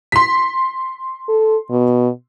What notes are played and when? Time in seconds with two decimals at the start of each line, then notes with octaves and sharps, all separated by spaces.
0.12 C6 B6
1.29 A4
1.71 B2